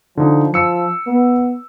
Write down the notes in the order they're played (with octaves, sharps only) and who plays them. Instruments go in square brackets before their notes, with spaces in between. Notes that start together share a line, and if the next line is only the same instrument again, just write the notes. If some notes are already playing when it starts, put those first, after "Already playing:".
[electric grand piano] D3 D#4 [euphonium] F3
[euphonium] F3 [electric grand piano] E6 C#7
[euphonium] B3